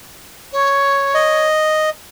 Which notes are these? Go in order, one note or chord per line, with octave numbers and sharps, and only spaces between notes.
C#5
D#5